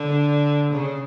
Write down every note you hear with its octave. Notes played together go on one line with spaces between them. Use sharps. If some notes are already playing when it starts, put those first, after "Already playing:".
Already playing: D3
C#3